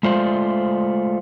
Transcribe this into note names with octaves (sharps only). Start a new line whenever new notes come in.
G#3 A3 F4 C5 D5